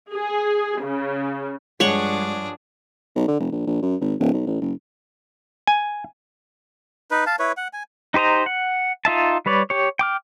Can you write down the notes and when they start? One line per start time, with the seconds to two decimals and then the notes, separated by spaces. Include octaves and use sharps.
0.12 G#4
0.81 C#3
1.80 G2 F3 G#3 D4 G#4 C#5 F#5 C#6
3.16 B1
3.28 D3
3.40 F1
3.52 A#1
3.67 A#1
3.82 F#2
4.01 G#1
4.20 D1
4.33 B1
4.47 A1
4.61 F#1
5.67 G#5
7.11 D#4 B4
7.26 F5 A5
7.39 E4 B4 C#5
7.57 F#5
7.73 G#5
8.14 D#4 G4 C5 D#5 A#5
8.46 F#5
9.05 D#4 F4 E5 A5
9.46 G3 B4 C#5 D5
9.70 G4 C#5
9.99 G5 D6 F6